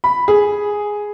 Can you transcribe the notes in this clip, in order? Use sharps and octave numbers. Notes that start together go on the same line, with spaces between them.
B5
G#4